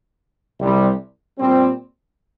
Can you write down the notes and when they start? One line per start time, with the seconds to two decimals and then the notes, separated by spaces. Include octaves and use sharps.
0.59 C2 C3 G3
1.38 A#2 G3 C4